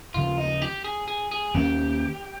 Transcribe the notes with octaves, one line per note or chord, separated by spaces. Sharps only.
D#2 C#3 F3 F4
D#4
G4
G#4
G#4
G#4
D#2 D#3 A#3 C#4 G4